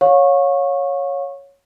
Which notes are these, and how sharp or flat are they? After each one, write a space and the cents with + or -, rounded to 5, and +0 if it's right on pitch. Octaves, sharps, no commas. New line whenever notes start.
C#5 +0 F5 +35 C#6 -15